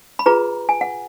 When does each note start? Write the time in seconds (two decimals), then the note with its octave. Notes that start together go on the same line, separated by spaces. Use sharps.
0.19 B5
0.26 F4 G#4 B4 A#5
0.69 G#5
0.81 F#5